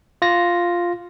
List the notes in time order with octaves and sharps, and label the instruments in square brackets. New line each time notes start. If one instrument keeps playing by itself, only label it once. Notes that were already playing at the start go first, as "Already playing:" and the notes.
[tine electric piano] F4 A#6